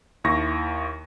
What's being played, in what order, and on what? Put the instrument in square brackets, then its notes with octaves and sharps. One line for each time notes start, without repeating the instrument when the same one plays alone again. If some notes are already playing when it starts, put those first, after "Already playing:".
[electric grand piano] D#2 E4 C#6 A#6